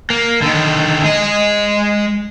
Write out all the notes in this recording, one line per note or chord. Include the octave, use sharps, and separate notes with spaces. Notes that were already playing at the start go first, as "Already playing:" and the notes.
A#3
D3 D#3
G#3 D#5